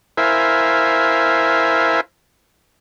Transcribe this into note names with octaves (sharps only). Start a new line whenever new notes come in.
E4 A#4 C5 E5 F5 G#5